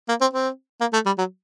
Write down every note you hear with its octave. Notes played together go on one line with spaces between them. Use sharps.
A#3
C4
C4
A#3
A3
G3
F#3